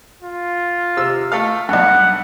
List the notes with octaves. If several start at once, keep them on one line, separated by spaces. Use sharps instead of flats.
F4
C3 E6
A3 A4 F5
B1 G2 F#5